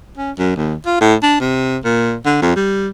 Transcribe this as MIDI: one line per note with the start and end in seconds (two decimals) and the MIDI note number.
0.18 0.31 61
0.39 0.55 42
0.56 0.75 39
0.86 0.99 65
1.01 1.15 45
1.23 1.37 62
1.40 1.78 48
1.85 2.16 46
2.26 2.38 50
2.42 2.55 41
2.56 2.88 55